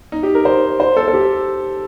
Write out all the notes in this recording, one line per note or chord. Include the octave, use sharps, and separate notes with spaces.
D#4
G4
A#4
C5
C5
A4
A4
G4